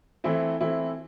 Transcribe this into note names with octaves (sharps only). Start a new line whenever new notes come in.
E3 A3 C4 E4
E3 A3 C4 E4